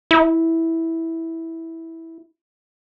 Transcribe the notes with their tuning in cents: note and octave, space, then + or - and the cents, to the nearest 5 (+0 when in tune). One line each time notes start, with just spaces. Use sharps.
E4 -10